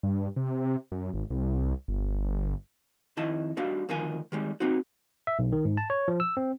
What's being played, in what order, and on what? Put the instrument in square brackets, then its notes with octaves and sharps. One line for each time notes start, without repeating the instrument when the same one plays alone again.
[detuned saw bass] G2
C3
F#2
G#1
C2
G1
[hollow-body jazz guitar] F2 D#3 E4 D#5 A5
G3 A#3 D4 F#4 F5
D2 D#3 F3 F4 A#4 G#5
D#3 G3 G#3
A#3 C4 D#4 F#4
[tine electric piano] E5
B1
D#3
G#2
A5
C#5
F3
E6
C4